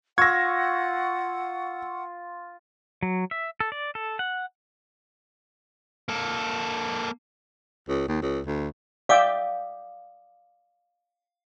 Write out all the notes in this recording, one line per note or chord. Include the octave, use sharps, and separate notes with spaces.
F4 F#5 C#6 E6 G#6 A#6
F#3
E5
A4
D5
A4
F#5
A#3 A4
C#2
D#2
C#2
D2
D5 E5 F5 G5 D6 D#6